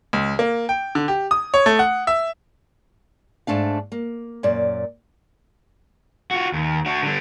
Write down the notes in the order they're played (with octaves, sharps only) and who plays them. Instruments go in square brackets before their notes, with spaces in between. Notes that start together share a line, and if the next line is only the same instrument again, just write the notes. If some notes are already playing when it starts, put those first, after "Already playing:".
[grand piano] C#2
A#3
G5
D3
G4
D#6
C#5
A3
F#5
E5
[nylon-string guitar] G#2 A3 D4 F5
A#3
F#2 A#2 D5
[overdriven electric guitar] F4 F#4
D#2
D4 F#4
D3 G3